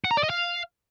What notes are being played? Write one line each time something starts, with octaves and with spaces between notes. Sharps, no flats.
F#5
A#5
D5
D#5
F5